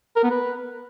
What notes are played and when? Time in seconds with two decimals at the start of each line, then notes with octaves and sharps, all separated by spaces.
0.16 A#4
0.24 B3
0.31 B4